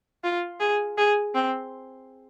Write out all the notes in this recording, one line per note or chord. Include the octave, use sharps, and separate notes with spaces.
F4
G#4
G#4
C4